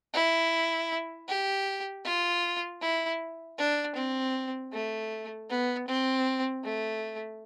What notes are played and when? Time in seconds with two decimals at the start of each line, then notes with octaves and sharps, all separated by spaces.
0.14 E4
1.28 G4
2.05 F4
2.81 E4
3.58 D4
3.96 C4
4.73 A3
5.50 B3
5.88 C4
6.64 A3